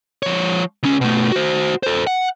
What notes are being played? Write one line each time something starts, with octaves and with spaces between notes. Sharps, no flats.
F3 C#5
C#2 C#4
B2 A3
F#4 C5
A4 C5
F#5